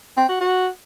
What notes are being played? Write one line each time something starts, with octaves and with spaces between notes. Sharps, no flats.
C4
F#4
F#4